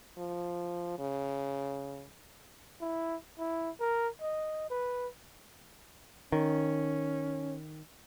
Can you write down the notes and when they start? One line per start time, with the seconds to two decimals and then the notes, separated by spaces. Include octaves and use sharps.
0.17 F3
0.98 C#3
2.81 E4
3.39 E4
3.80 A#4
4.22 D#5
4.70 B4
6.32 D#3 C#4